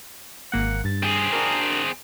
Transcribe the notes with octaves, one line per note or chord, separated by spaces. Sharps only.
G#1 A#3 F#5
G2 A6
C4 G#4
D4 F#4 A#4